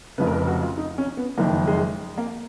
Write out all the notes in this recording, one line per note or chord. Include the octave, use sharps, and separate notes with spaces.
F1 F2 C#3 B4
A#4
B4
F#4
F4
D#4
C#4
B3
F#1 F2 D#3 A#3
G#3
A#3